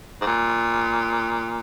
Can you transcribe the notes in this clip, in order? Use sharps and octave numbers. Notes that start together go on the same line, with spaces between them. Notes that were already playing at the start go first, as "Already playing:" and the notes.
G#2
A#2